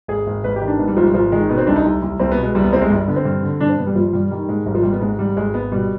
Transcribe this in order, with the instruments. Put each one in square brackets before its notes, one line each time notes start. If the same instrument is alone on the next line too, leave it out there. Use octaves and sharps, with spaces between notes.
[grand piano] G#1 G#4
G#1
G#1 B4
G4
D#3
D4
G#2 B3
G3
G#1 F3
G3
G#1 F3
D#3 G#3
B2 B3
C4
C2 D4
D#4
C2
C2
C2 C4
B3
B2
G#3
C2 G3
B3
C2 C4
G#3
G1 G3
D3 B3
C4
G2
D3
G2 D4
C4
G2 B3
G3
G1 F3
G2 G3
D#3 G3
G#2 G#3
G#1 G3
F3
G#1 G3
B3
G#2 G#3
G#1 G3
G#1 G#3
G#1 B3
B2 G3